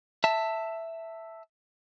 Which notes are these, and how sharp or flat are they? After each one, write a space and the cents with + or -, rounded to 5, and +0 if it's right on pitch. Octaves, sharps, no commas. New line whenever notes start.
E5 +0 A5 +15